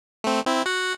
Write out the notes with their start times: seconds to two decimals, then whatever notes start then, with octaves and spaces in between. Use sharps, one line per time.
0.24 A3 C4
0.46 C4 E4
0.66 F#4 F#5